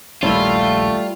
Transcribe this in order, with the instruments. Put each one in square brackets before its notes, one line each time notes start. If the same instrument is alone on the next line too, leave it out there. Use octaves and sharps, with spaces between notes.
[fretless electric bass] A#1 D#2 C#4 [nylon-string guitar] G3 E4 [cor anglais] A3 [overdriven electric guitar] F4